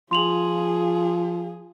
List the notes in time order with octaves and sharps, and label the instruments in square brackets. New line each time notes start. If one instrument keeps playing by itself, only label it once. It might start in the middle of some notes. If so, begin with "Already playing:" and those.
[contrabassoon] F3 [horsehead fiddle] F4 G#4 [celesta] C6 F7 F#7